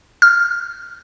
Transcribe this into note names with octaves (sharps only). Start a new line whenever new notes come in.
F6